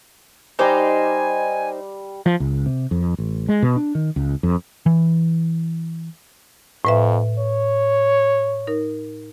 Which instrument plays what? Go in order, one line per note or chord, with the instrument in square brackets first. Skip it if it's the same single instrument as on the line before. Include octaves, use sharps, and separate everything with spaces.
[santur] G3 D6 [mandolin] D#4 C5 [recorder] G#5
[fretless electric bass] F3
C#2
C3
F2
A1
G#3
B2
D4
D#3
C#2
F2
[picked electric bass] E3
[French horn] F2 [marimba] A2 B4 E5
[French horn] C#5
[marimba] D#4 A#4